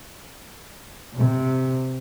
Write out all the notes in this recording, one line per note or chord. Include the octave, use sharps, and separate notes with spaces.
C3